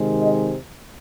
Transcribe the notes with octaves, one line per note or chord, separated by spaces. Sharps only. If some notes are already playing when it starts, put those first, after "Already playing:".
Already playing: C3 D#3 G#3
D#5